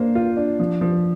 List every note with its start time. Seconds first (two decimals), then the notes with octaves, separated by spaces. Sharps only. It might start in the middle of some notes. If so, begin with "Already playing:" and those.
Already playing: A#3 D4 C5
0.15 F4
0.37 D4
0.59 F3
0.81 F3